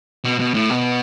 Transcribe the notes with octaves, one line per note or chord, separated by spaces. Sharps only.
B2
B2
A2
B2